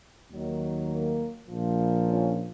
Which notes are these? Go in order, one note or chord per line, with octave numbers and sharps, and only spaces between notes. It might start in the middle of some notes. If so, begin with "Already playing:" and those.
D#2 D#3 F#3
A#3
A#1 A#2 F3
C#4 F4